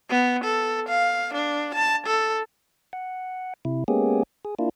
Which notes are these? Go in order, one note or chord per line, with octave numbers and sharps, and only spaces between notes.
B3
A4
F5
D4
A5
A4
F#5
C3 E4
G#3 A#3 B3 C#4 G4 G#4
G#4
A#3 D4 E4 F4